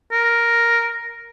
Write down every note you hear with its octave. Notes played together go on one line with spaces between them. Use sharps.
A#4